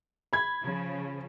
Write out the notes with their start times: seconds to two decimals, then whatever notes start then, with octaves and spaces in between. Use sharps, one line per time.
0.33 B5 G#6
0.63 C#3 F3